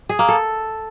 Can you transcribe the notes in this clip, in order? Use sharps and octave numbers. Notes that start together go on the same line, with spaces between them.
G#4
A#3
A4